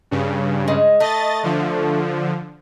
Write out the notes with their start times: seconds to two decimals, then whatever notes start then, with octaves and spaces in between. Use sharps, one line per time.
0.11 G2 C#3
0.68 G#3
1.00 A3 D#5 A6
1.43 D3 F3